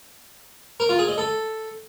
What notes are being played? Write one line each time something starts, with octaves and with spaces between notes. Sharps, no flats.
A#4
F4
G#4
D#5
A4